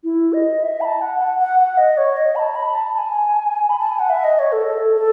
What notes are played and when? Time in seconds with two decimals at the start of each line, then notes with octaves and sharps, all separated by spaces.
0.04 E4
0.33 D#5
0.63 E5
0.81 B5
0.85 A5
1.01 F#5
1.20 F#5
1.39 F#5
1.59 F#5
1.77 D#5
1.97 C#5
2.17 D#5
2.35 B5
2.39 A5
2.55 B5
2.74 A5
2.94 A5
2.98 G#5
3.69 B5
3.79 A5
3.89 G#5
3.99 F#5
4.09 E5
4.24 D#5
4.39 C#5
4.52 A4
4.67 A4
4.96 A4